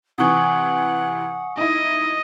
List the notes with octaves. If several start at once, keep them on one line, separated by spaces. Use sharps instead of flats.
C3 E3 F#5 G#5 C#6 D#6
D#4 E4 D#5